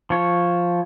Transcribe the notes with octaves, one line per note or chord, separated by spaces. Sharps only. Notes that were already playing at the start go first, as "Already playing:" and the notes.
F3 C#5